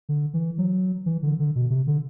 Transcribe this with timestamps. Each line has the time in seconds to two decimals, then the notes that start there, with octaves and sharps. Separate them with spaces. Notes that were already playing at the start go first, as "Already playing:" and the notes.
0.09 D3
0.34 E3
0.58 F#3
1.06 E3
1.23 D3
1.39 D3
1.56 B2
1.70 C3
1.87 D3